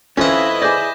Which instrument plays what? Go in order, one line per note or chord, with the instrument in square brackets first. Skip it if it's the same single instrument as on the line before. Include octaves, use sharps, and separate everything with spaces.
[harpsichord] F2 F#5 [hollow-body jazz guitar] C#4 F4 [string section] E4 B4 D#5
[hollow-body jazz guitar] G#4 D5 [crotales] D6 G6 A#6